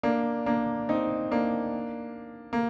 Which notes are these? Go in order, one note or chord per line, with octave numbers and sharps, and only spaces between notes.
A#3 D4
A#3 D4
C4 D#4
A#3 D4
A#3